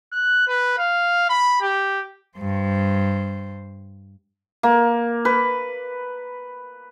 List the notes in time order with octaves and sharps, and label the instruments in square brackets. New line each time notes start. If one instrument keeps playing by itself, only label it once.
[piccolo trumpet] F#6
B4
F5
B5
G4
[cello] G2 C5
[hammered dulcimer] A#3
B4